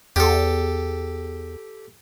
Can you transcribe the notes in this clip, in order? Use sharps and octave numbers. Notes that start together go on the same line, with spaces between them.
E2 G4 A4